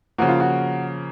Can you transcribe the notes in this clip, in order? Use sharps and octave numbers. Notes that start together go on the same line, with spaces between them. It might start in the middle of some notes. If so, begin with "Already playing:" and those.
C#3 F3 A#3 F#4
F4
F#4